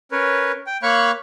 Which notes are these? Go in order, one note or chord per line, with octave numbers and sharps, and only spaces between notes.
C#4 A#4 B4 C#5
G5
A#3 C#5 F5 B5 C#6 F#6